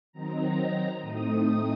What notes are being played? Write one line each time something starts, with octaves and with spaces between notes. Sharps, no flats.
D#3 F#3 C4 D#4 A#5
A2 A3 C4 D#4 D#6